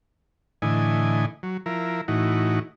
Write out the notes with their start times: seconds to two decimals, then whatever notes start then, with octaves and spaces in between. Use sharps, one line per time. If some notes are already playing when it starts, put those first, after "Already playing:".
0.62 A2 D3 E3 D#5 G#5
1.43 F#3
1.66 F3 E4 A#4
2.08 A2 E3 D#4 F#4